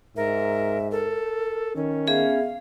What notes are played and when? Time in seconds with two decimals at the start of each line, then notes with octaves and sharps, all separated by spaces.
0.16 G#2 A#4 E5
0.92 A4 A#4
1.76 D#3 C#4
2.07 B3 G#4 E5 F5